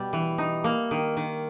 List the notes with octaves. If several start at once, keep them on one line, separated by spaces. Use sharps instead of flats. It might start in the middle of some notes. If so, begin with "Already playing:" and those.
Already playing: B2 G3
E3
D#4
A#3
D#3
D#3